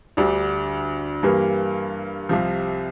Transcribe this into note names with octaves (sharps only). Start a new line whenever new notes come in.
D2 D3 G3 D4
G2 E3 G3 A#3
C2 C3 F3